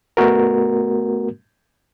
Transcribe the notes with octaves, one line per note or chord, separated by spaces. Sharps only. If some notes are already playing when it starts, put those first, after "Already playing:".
A3 B3 F#4 A#4